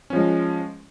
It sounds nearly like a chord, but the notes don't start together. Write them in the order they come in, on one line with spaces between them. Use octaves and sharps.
C#4 F3 G#3